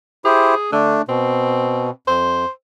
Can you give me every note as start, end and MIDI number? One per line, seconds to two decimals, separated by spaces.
0.25 0.55 64
0.25 0.55 67
0.25 0.67 68
0.25 0.55 72
0.72 0.96 50
0.72 1.02 57
0.72 1.02 62
1.09 1.90 47
1.09 1.90 60
2.08 2.45 41
2.08 2.49 72